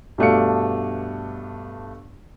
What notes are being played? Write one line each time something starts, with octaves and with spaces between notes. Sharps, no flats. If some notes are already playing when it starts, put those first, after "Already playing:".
G2 B2 A3 D4 F5 C#7